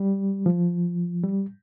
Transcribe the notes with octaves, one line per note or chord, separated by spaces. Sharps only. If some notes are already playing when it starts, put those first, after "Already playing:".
Already playing: G3
F3
G3